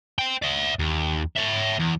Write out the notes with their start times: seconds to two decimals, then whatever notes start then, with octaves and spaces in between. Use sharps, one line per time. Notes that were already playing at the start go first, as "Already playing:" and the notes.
0.19 C5 G5
0.42 D5 E5
0.79 D#2
1.36 C#5 E5
1.79 E2